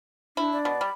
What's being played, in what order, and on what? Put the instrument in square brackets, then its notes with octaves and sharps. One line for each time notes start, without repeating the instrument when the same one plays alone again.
[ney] D4 [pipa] E4
[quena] D5
[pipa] B2
[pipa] G3 [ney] B5